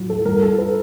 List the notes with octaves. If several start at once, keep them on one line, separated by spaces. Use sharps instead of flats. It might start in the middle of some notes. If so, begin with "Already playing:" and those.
Already playing: A2 F#3
A4
G2 A#4
A4
B4